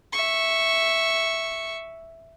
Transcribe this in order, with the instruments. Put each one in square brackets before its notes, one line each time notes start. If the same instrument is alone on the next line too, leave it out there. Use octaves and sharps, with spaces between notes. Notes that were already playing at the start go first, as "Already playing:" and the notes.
[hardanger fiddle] E5 C#6